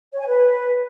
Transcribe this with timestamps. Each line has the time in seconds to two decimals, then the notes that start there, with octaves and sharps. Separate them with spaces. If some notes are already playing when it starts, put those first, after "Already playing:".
0.13 C#5
0.20 G#5
0.27 B4